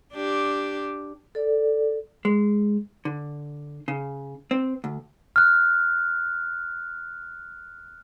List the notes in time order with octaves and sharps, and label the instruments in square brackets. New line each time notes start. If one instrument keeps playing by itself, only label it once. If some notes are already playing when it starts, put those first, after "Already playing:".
[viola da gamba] D4 G4
[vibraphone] A4 D5
[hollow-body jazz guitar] G#3
D3
C#3
C4
D2
[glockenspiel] F6 F#6